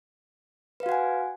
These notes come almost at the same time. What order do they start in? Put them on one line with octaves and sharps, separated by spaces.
B4 F5 F#4 F#5 G#5